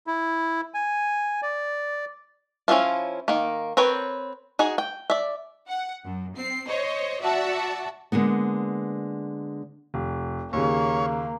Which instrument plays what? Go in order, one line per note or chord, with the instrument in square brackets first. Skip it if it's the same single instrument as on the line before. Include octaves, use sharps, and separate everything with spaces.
[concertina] E4
G#5
D5
[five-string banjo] F3 C#4 D4 E4 F4
D#3 A#3
C4 A#4 B4 C#5 G5
D#4 F#4 G#4
G5
D5 E5
[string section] F#5
F#2
C4 C7
C5 C#5 D#5
F#4 D5 E5 F#5 A5
[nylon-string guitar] D3 G#3 A#3 B3
[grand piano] F1
[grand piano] D#2 C#3 [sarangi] A#3 [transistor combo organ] C#5